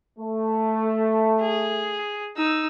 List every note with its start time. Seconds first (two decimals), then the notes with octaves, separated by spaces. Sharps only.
0.19 A3
1.41 G#4
2.37 D#4 E6